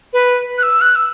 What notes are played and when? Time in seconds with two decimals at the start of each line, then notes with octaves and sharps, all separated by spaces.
0.13 B4
0.58 F#6
0.63 E6
0.81 F#6
0.96 E6